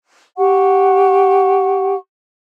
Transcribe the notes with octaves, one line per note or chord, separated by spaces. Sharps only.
G4 F#5 C#6